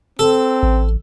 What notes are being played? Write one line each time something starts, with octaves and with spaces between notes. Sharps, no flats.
C4 A4
A1